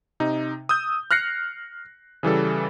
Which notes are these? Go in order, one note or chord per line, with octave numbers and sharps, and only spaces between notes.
C3 D#4
D#6 E6 G6
F6 F#6 A#6 C7 C#7
C#3 E3 G3 A4